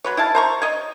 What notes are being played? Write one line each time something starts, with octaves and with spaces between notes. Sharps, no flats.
F#3 B4 C#5
E4 F5 A5
C5 A#5 C#6
C#5 D#5